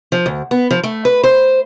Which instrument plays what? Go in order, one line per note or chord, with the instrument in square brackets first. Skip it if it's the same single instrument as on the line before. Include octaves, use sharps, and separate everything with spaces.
[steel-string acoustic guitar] F3
D2
B3
F3
A3
B4
C5